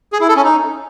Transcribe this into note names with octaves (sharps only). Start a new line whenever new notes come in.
G#4
E4
A4
C#4
D#4